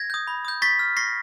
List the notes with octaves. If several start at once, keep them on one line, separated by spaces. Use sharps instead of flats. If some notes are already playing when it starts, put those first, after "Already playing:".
Already playing: G#6 A#6
D#6 G6
B5
D#6 G6
C#6 A6 B6
F6
C#6 A#6 C7